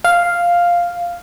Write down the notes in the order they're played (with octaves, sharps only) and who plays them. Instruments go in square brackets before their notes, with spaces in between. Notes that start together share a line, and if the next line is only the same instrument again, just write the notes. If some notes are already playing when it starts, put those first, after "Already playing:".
[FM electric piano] F5